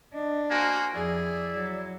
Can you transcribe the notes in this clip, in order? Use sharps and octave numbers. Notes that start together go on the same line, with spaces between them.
D4 D#5
A#3 F#4 C5 G#5
F2 E4 G#4 D5
F#3